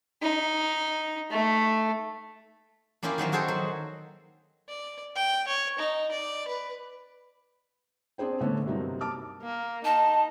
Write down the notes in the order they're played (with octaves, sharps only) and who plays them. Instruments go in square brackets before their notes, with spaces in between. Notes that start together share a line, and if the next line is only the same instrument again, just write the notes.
[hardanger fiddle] D#4
A3
[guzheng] A#3 C#4 E4 F4 G4
D#3 F#3 A#3 C4
C4 F#4 G#4 A4 C5
F#3
[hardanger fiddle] D5
G5
C#5
D#4
D5
B4
[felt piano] C4 D4 G#4 C5 G5
D3 A3 B3 C#4
G2 C3 F#3 A#3 C4 D#4
A5 D6 F6
[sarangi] A#3
[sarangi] D#4 [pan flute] A5